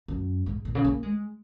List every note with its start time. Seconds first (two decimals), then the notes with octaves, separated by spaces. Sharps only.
0.08 F#2
0.46 G#2
0.65 A#2
0.75 C#3
0.84 A#3
1.03 G#3